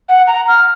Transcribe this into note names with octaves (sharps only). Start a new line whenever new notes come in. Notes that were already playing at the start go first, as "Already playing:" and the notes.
F#5
A#5
F6